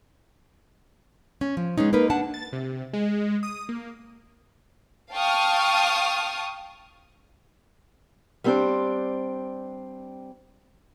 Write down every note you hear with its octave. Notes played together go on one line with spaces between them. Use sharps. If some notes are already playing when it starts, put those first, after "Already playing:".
C#4
F3
G#3 B3 C#4 D#4
A#3 D#4 A#4 B4
D4 F#5 A5
A6
C3
G#3
D#6
A#3
F5 G5 A5 C#6 D#6 F6
G3 B3 C4 D4 C5 D5